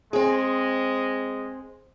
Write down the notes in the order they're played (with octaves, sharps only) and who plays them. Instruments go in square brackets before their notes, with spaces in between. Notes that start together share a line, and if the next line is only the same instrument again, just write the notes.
[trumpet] G#3 [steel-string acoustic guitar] C4 G#4